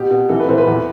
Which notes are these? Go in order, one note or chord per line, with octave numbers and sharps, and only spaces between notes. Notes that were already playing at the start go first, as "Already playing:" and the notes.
Already playing: B2 G4
B2
E3 A4
B4
E3 C5
B4
E2